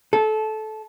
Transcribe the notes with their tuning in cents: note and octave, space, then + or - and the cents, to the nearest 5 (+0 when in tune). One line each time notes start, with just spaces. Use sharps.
A4 -20